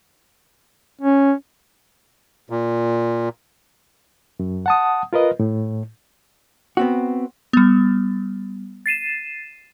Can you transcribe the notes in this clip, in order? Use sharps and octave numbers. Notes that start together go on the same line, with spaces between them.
C#4
A#2
F#2
F#5 A5 D#6
F4 A#4 B4 D#5
A2
B3 C4 F#4
G3 B3
A6 C7 D#7 E7